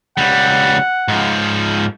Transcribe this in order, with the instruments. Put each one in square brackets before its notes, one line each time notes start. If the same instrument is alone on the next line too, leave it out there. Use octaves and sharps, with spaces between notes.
[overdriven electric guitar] C#2 G3 [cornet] F#5
[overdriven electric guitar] G#2 F3